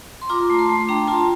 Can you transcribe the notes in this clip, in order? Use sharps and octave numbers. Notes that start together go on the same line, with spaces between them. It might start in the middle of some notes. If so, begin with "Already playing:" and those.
C6
F4 A#5 D6
A3
A5 C6
A3
D4 G5 A#5
F4 A5 C6